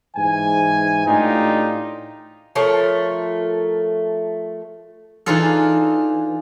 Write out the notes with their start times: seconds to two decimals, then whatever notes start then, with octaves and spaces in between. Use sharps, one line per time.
0.16 G#2 E3 G#5
1.07 A2 D4 D#4 F4 G4
2.55 F3 A3 A#4 C#5
5.26 E3 D4 D#4 F4 G#4 A4